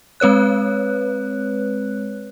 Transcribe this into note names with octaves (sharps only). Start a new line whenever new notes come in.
G#3 C4 B4 C#5 F#6